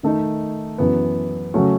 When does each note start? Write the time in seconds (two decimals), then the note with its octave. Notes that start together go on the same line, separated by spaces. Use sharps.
0.03 D#3 A3 D#4
0.78 F#2 E3 B3
1.54 C#3 F#3 A3 C#4 F#4